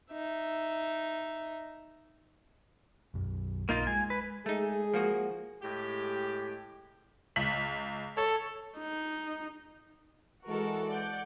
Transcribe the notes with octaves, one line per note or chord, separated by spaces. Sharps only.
D#4 E5
B1 F#2
B1 A#3 D#4 F4
G#3 G#5
B4
G#3 A3 D#4 G#4
F3 A#3 F#4
A2 G#3 G4
C#2 B6 F#7
A4 C#5
D#4
E3 G#3 F#4 A4 A#4
D5 F#5 G6